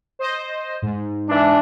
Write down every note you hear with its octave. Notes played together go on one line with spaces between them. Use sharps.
C5 D#5
G#2
E3 D4